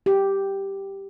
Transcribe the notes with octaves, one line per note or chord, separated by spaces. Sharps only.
G4